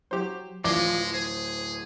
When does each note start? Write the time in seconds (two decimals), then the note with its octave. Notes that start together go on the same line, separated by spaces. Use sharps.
0.11 F#3 G4 C5
0.64 D1 E3 F3 G#3 D5 D6 G7
1.13 G#4 C5